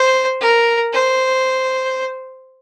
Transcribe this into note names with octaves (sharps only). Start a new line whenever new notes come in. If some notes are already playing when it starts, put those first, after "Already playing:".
Already playing: C5
A#4
C5